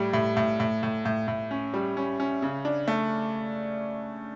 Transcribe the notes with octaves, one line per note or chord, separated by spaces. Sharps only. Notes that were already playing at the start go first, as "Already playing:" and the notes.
Already playing: A2 G3
A2
A2
A2
A2
A2
A2
C#4
G3
C#4
C#4
C#3
D4
A3